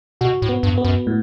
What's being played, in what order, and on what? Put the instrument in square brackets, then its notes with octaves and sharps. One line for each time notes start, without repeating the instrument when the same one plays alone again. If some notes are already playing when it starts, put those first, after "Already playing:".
[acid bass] B2 [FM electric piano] F#4
[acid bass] A2
[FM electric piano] B3
[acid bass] G2
[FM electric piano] B3
[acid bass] F#2
[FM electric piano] A2